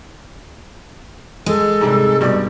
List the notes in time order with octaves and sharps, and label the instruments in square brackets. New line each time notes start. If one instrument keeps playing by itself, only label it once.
[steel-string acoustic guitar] G#3 [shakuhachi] A4
[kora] G#2 C3 G3
[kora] G2 B2 G4 [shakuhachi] D5